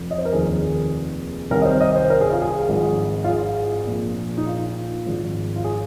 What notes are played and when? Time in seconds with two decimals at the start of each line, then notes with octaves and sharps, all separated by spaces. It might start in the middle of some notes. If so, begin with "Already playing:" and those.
Already playing: F1 F2
0.11 D#5
0.18 C5
0.25 A#4
0.33 F1 D#2 D#3 G#4
1.51 C2 C3 D#3 A#4
1.62 D#5
1.65 C5
1.81 D#5
1.96 C5
2.10 A#4
2.21 G#4
2.32 F4
2.42 G#4
2.69 G#1 G#2 F3
3.24 F4
3.28 G#4
3.87 A#1 A#2 F3
4.37 D#4
4.47 F4
5.06 G#1 G#2 F3
5.56 F4
5.64 G#4